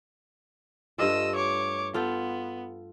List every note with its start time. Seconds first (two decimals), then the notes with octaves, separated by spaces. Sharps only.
0.98 G2 A3 F4 D#5 E6
1.36 C#5 D6
1.94 B3 F4 A4 G5